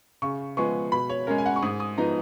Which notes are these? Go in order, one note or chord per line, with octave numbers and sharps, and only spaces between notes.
C#3 C#6
F3 G#3 B3 C#6
B2 B5
C#5
G#3 C#4 A#4
G#5
F#5
C#6
G#2 D#6
D#6
F3 B3 D#4 A#5